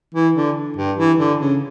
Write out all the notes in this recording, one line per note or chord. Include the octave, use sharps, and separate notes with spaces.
E3
D3
G2
E3
D3
C#3